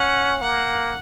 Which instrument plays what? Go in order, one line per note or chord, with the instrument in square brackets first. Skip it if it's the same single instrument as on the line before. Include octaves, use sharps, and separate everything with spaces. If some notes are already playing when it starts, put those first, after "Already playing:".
Already playing: [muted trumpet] C#4 [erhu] F#5
[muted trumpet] A#3 [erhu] F#5